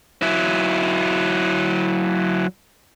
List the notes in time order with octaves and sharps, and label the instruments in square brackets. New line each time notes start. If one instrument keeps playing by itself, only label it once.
[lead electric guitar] F#3 E4